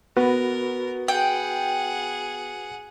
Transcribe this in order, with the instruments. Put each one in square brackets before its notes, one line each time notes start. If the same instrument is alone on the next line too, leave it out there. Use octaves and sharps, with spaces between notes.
[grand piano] B3 [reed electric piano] F#4 B4 [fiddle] A#4
[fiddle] G#4 F#5 [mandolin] G5